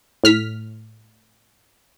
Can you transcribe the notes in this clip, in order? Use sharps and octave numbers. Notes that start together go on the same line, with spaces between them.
A2 F6 B6